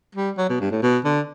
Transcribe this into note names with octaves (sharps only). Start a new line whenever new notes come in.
G3
F#3
B2
G2
A2
B2
D3